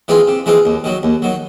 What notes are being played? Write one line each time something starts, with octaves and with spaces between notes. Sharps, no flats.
E3 G#3 C4 F4
C3
E3 G#3 C4 F4
D#2
D#3 F#3
D#2
D#3 F#3